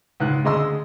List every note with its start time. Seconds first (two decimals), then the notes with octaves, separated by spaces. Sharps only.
0.20 C#2 G#2 F#6
0.44 D2 C#3 G#3 D#5 C6 E6